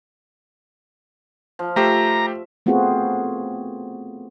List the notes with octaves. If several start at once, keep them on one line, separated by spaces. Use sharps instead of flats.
F3
A3 G4 C5 E5 A#5
A3 B3 C4 F4 F#4 G#4